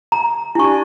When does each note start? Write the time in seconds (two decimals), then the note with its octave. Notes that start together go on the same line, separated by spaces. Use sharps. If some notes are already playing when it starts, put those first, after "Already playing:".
0.12 A#5
0.55 D4 E4 G4 G#5 C#6